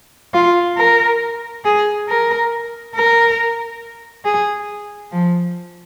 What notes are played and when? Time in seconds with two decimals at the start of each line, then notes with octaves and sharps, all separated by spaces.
0.34 F4
0.77 A#4
1.65 G#4
2.09 A#4
2.95 A#4
4.25 G#4
5.12 F3